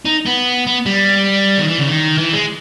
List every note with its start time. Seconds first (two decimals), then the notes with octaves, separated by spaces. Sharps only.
0.05 D#4
0.26 B3
0.67 B3
0.86 G3
1.58 D#3
1.67 E3
1.78 C#3
1.87 D#3
2.18 E3
2.32 G#3